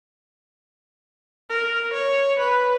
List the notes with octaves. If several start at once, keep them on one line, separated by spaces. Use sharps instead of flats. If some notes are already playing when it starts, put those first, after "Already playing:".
A#4
C#5
B4